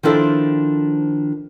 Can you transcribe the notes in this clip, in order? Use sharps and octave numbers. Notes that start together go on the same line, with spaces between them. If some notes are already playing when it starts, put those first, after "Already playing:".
D#3 F3 D4 E4 A4 C5